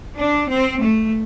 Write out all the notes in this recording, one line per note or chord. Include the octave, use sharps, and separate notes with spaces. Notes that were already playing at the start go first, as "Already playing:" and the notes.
D4
C4
A3